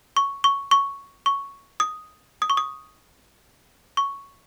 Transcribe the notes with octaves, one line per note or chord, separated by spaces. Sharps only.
C#6
C#6
C#6
C#6
D#6
D#6
C#6
D#6
C#6